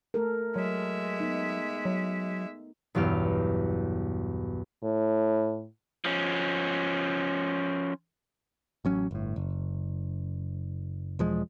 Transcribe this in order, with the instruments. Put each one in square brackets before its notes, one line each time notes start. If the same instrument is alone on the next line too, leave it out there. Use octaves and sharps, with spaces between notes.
[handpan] A3 A4 A#4
[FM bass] F#3 [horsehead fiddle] G#3 E5
[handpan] B3 D#4
[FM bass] F#3
[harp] B1 E2 G2 G4 F6
[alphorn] A2
[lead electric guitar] F3 C#4
[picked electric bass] A1 F#3 C#4
G1 A2
F#1
E1 F3 G#3